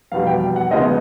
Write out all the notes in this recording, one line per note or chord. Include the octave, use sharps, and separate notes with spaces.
F1 E2 B2 G3 F5
G5
F#5
D2 C#3 F3 G#3 B3 D#5